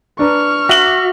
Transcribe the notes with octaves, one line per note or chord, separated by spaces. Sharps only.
D4 B4 A#5 C#6 F6
F#4 E5 D6 F#7